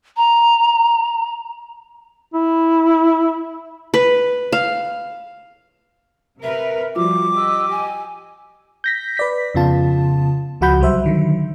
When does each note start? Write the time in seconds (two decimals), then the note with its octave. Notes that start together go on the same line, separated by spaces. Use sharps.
0.17 A#5
2.34 E4
3.94 B4
4.52 F5
6.43 C3 A#4 B4 E5
6.96 F3 G3 F4 F#4 D6
7.35 G4 D#5 E6
7.71 G#5
8.84 G6 A#6 B6
9.17 B4 D5 B6
9.55 F2 C#3 B3 F4 A5
10.61 C#2 F3 F#4 F#5 B5 G6
10.80 C2 F#3 G3 C5 E5
11.04 D3 D#3 F#3